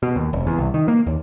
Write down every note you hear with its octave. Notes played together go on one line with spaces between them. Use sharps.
B2
D#2
F1
E2
C2
D#3
A#3
D#2